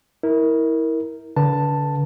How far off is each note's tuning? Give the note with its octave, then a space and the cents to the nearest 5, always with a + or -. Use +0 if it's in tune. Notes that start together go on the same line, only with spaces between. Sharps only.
E4 -25 A#4 +0
D3 -40 B4 -25 A5 +5